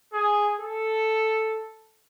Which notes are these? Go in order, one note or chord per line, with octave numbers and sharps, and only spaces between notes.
G#4
A4